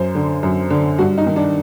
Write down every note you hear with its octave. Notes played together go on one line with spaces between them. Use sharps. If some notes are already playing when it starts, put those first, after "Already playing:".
Already playing: F#2 C5
D3
F#2
D3
G2 F#4
D#4
D#3
D4